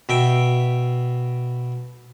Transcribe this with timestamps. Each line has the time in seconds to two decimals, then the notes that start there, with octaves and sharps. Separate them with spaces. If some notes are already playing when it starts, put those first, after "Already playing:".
0.09 B2 E5 G5